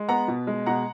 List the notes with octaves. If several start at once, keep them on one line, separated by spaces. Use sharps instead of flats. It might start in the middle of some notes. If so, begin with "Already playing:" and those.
Already playing: G#3
B3 F#5 A#5
B2
G#3
B2 F#5 A#5